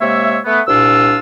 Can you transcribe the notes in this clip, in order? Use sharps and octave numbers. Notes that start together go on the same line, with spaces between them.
C3 G#3 A#3 C#5 E5
A3 B3
C2 A#2 D4 F4 E6